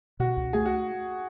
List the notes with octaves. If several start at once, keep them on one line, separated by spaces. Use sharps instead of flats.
B2 F#4
C#2
A3 G#4
F#4